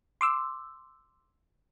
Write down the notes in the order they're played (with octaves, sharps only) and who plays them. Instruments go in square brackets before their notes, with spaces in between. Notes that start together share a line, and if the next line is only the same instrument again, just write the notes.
[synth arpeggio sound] C6 D6 E6